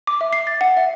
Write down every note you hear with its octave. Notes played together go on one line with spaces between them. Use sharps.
D6
E5
C7
A6
F#5
E5